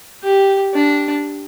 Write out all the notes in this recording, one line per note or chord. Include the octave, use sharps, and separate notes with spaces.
G4
D4